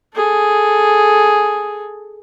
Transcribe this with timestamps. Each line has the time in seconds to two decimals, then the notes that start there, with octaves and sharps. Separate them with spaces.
0.15 G#4 A4